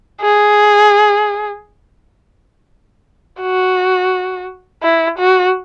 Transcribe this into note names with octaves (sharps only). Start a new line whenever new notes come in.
G#4
F#4
E4
F#4